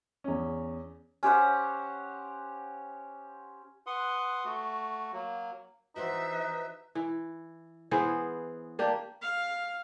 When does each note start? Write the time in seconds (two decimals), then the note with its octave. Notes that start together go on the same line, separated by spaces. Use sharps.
0.24 E2 C#4
1.23 C#4 G4 C5 F#5
3.87 B4 F#5 C6 D#6
4.45 A3 F#4
5.13 F#3 A#3
5.96 E3 D#4 F#4 G4 B4 C5 E5
6.95 E3
7.91 E3 B3 G#4 C5
8.79 A#3 D4 G4
9.21 F5